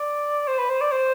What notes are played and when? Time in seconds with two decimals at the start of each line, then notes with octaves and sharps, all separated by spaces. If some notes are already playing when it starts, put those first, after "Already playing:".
Already playing: D5
0.47 C5
0.58 B4
0.69 C5
0.81 D5
0.92 C5